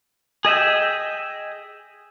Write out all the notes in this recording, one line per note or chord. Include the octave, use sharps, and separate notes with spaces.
G#4 D#5 E5 G5